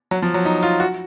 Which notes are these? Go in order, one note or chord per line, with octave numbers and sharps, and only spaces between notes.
F#3
F3
F#3
D#4
F4
F#4